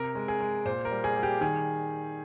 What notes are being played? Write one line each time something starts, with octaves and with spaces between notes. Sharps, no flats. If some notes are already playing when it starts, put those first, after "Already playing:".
Already playing: C3 A#4
G#3
G#4
G#3
A#2 C5
A#4
G3
G#4
G3
G4
D#3 G#4